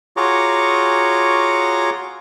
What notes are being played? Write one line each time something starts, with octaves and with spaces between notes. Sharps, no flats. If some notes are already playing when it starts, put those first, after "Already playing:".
F4 F#4 G#4 C#5 A#5 D6